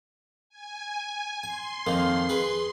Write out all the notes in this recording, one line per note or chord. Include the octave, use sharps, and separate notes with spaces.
G#5
G#5 C6
F2 D#3 A#3
G#4 B4